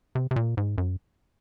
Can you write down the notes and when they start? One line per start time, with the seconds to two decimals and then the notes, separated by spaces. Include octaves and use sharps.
0.15 C3
0.31 C3
0.36 A#2
0.57 G#2
0.78 F#2